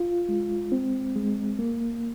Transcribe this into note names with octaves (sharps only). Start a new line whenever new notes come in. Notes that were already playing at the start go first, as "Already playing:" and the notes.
Already playing: F4
G#3
C4
G#3
A#3